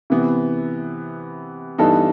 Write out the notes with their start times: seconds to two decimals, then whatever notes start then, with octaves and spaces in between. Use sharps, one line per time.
0.10 C3 E3 B3
1.78 G2 E3 B3 D#4 A4